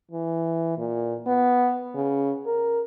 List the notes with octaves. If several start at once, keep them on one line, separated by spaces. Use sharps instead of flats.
E3
A#2
B3
C#3
A#4